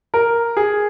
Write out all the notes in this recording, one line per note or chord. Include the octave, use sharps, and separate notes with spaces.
A#4
G#4